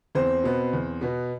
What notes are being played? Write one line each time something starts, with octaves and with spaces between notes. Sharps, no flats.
E2 C4 C5
B2 B3
E2
B2 B3